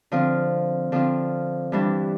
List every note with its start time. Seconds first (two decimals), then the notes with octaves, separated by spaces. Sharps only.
0.12 D3 F3 C4 F4
0.92 D3 F3 C4 F4
1.72 G2 E3 G3 D4